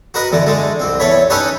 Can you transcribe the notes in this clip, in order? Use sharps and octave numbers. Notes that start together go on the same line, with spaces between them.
F#4 A#4 B4 D#5
E2 D3 A3
D3 G#3 A3
C2 C4
E2 A3 C#5 B5
C#4 D#4 G4 A4 B4 C#5